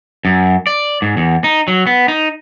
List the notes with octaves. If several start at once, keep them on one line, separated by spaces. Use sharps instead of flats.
F#2
D5
G#2
E2
D#4
F#3
B3
D#4